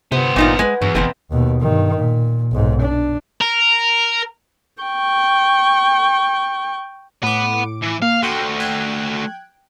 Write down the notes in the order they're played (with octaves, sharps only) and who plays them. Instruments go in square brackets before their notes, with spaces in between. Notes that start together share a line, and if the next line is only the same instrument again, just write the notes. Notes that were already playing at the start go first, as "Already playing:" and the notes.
[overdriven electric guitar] G2 B3 [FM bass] C3 [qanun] C5
[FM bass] G#1 [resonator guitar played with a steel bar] A#2 D#4 F4
[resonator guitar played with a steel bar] G#3 [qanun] B4 F#5 G#5
[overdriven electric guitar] E2 [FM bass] G2 [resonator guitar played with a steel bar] F#3
[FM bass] F#1 [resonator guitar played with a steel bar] B2 B3 C4 [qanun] D#5 E5 F#5
[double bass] D#2 B2
G2 D#3
A#2
B1 G#2
D4
[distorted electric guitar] A#4
[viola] G5 C#6
[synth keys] A2 D6 [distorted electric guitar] F#5 B5
[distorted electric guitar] E3
[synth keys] A#3 [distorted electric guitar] F5
[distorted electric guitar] A3 F#4 [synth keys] G5 C6
[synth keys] G5 F#6 G#6